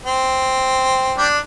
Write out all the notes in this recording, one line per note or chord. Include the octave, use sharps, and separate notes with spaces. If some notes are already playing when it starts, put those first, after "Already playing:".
C4
G3 D4